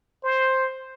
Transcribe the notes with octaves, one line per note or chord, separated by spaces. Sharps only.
C5